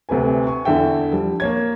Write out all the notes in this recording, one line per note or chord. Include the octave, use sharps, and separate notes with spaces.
D2 C3 B4 G#5
G#5 C#6
E2 D3 A4 E5 G5
F3 G3
A#3 C#5 G#6